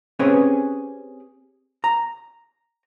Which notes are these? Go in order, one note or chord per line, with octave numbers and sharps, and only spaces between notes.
C4 C#4 G4 G#4 B4 C#5
A#5